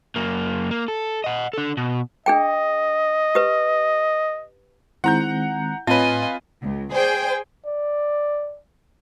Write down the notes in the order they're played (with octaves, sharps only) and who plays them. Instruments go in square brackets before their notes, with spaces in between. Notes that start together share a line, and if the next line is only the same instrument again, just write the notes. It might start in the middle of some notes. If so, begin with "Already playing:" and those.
[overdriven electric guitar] F#2 A#3
A#3
A4
D#5 F#5
D4 A4
B2
[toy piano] D4 G#4 G5 [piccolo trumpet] D#5
[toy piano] G4 B4
[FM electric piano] D#3 G#3 C4 [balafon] E4 [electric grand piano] F#5 A#5 G6
[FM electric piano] A2 [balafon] C4 C#5 [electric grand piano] F4 B4 [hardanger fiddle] D#5 G#5
[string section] C#2
G#4 C5 D5 G5 G#5
[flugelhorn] D5